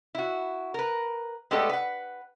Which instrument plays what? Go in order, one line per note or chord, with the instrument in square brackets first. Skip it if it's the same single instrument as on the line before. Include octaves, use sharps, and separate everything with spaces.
[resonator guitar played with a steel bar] E4 F#4
A#4 B4
G#3 A3 B3 D4 G4 A4
B4 F#5